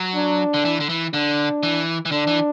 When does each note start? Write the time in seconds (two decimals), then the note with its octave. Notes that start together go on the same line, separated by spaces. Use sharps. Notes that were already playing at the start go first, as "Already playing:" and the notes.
Already playing: F#3
0.15 D4
0.54 D3
0.65 E3
0.80 D3
0.89 E3
1.14 D3 D4
1.63 E3
2.05 E3
2.11 D3 D4
2.27 E3